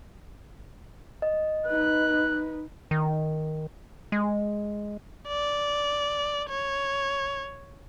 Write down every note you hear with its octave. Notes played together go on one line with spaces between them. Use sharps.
D#5
D#4 B4 F#6
D#3
G#3
D5
C#5